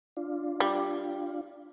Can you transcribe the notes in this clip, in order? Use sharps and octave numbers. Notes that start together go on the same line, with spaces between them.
D4 F4
G3